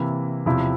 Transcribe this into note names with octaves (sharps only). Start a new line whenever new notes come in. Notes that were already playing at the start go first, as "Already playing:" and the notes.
Already playing: C3 E3 A#3 E4
E2 C3 F3 C4 E4